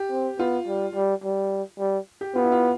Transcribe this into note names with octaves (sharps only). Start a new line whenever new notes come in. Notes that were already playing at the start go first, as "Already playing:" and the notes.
Already playing: G4
C4
B3 F4
G3
G3
G3
G3
G4
B3 F4
E4
F4